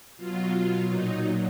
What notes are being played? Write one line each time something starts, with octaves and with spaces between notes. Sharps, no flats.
B2 F#3 F4
A#2 F#3 D#4